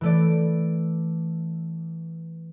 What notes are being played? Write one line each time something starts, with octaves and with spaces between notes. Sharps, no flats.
E3 A3 D5